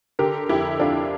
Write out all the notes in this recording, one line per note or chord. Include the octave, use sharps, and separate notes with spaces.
D3 G4 A#4
F2 E4 G4
F2 D4 F4